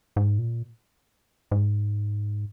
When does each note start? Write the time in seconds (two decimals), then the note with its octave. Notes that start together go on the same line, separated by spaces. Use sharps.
0.16 G#2
0.39 A#2
1.51 G#2